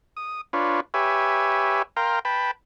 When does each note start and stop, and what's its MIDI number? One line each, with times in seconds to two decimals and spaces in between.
0.17 0.41 87
0.53 0.80 62
0.53 0.80 65
0.53 0.80 71
0.53 0.80 73
0.94 1.82 67
0.94 1.82 71
0.94 1.82 73
0.94 1.82 76
0.94 1.82 80
1.97 2.19 70
1.97 2.19 77
1.97 2.19 79
1.97 2.19 82
1.97 2.19 84
2.25 2.51 71
2.25 2.51 79
2.25 2.51 81
2.25 2.51 83